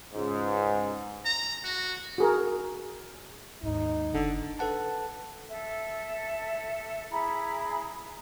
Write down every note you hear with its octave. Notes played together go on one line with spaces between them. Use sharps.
C#2 G#2
A#5
F#4
F#4 G#4 A#4
D#2 G#2 D#4
F#1 D3
A4 B4 F#5 A5
A4 E5
E4 G#4 A#5 B5